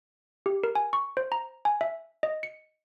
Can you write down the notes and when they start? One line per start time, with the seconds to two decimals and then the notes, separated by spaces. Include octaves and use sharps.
0.46 G4
0.64 A#4
0.75 G#5
0.93 C#6
1.17 C5
1.32 A#5
1.65 G#5
1.81 E5
2.23 D#5
2.43 C#7